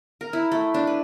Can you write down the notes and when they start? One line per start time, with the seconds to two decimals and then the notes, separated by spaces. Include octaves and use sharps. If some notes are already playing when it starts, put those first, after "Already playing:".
0.21 A#4
0.33 E4
0.52 A3
0.74 D4
0.87 B4